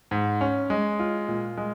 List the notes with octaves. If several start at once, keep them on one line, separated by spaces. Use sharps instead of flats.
G#2
C#4
G#3
F4
A#2
G#3